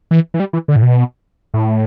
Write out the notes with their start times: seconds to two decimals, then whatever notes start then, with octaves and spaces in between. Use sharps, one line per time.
0.11 E3
0.34 E3
0.40 G3
0.53 E3
0.68 D3
0.76 A2
0.82 B2
1.54 A2